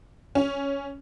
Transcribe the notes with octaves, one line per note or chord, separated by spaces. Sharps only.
C#4